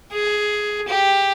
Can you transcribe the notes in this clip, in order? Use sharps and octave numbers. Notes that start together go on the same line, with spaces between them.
G#4
G4